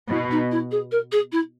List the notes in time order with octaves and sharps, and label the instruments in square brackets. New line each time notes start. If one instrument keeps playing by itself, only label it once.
[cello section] B2 [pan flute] E4
[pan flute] D#4
E4
G#4
A#4
G#4
E4